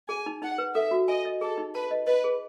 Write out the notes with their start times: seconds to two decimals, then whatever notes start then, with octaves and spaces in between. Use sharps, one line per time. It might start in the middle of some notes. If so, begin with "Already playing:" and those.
0.09 G#4 G#5
0.26 D#4
0.42 D#4 F#5
0.58 B4
0.75 A4 E5
0.91 F#4
1.08 D#5 G#5
1.25 D#5
1.41 G#4 A4
1.58 D#4
1.75 B4 A5
1.91 D#5
2.07 B4 D#5
2.24 G#4